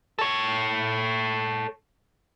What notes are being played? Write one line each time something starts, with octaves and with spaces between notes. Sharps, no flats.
A4 C#5